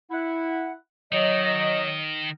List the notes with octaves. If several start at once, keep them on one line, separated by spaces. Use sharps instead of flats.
E4 F#5
D#3 F#3 D#5